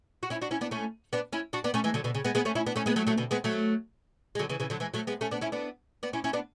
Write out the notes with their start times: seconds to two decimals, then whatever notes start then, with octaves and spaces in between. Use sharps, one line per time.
0.23 F#4
0.30 C#4 E4
0.42 D4 F#4
0.51 C#4 E4
0.61 B3 D4
0.71 A3 C#4
1.13 B3 D4
1.33 C#4 E4
1.53 D4 F#4
1.64 B3 D4
1.74 A3 C#4
1.84 E3 G#3
1.94 D3 F#3
2.04 B2 D3
2.15 C#3
2.25 G#3 B3
2.35 G#3 B3
2.45 A3 C#4
2.55 C#4 E4
2.66 B3 D4
2.76 A3 C#4
2.86 G#3 B3
2.96 F#3 A3
3.07 F#3 A3
3.18 B2 D3
3.31 G#3 B3
3.44 F#3 A3
4.35 G#3
4.39 D3 F#3
4.49 C#3 E3
4.60 C#3 E3
4.70 D3 F#3
4.80 E3 G#3
4.94 F#3 A3
5.07 G#3 B3
5.21 A3 C#4
5.31 B3 D4
5.41 C#4 E4
5.52 B3 D4
6.03 B3 D4
6.13 C#4 E4
6.24 C#4 E4
6.33 B3 D4